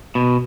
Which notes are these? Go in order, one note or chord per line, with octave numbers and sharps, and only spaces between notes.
B2